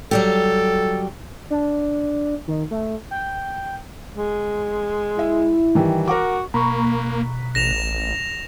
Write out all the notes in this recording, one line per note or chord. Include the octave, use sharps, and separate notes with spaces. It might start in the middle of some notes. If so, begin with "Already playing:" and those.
F#3 G3 G4 A4
D4
D#3
A3
G5
G#3
E4 E5
D#3 E3 G3
F#4 A#4 F#5 D6
B2 A#3 A#5 B5 C#6
A1 A#6 E7 F7